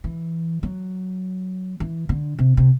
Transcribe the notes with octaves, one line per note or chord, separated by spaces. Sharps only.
E3
F#3
E3
D3
C3
C3